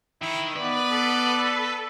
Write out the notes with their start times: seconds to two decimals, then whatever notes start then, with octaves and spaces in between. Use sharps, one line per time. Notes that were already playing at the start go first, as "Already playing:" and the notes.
0.22 D#3 E4
0.56 B3 B4 D5
0.91 A4